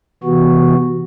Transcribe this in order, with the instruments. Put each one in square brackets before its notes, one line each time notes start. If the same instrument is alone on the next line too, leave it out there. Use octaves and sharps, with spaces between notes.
[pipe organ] C3 E3 B3 F#4